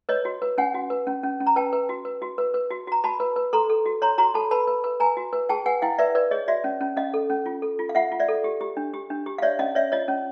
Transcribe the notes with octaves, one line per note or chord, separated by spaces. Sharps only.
B4 C#5 D#5
F#4
B4
C#4 F#5 G#5
F#4
B4
C#4
C#4
C#4
A#5
B4 G5 A5
B4
F#4
B4
F#4
B4
B4
F#4
F#4 A#5
F#4 A5 B5
B4
B4
A4 A#5 C6
A4
F#4
C#5 A#5 C6
F#4 A#5 C6
A4 A5 B5
B4 A5 B5
B4
B4
B4 G#5 A#5
F#4
B4
G#4 G5 A5
B4 F#5 G#5
E4 F5 G5
B4 D5 E5
B4 D5
G#4 C#5 D#5
F#4 D5 E5
C#4
C#4
C#4 D#5 F5
A4
C#4
F4
A4
F4
F5
F4 E5 F#5
F4
D5 E5
A4
G4
G4
D4
G4
D4
G4
F5
C#5 D5 E5
C#4 D#5 F5
C#5 D5 E5
F4 C#5 D#5
C#4